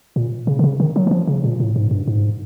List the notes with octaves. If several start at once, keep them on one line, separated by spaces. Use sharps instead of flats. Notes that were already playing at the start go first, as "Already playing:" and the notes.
A#2
C#3
D3
C#3
D#3
F#3
E3
F3
C#3
A#2
A2
G#2
G2
G#2